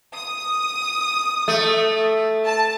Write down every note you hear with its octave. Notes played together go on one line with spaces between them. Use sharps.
D#6
A3
A5